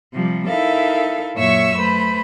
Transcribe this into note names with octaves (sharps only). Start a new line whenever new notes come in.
C3 F3 G3
D#4 E4 A4 A#4 E5 F5
F#2 A#2 C#5 E5 C#6 E6
A3 B4 C5 B5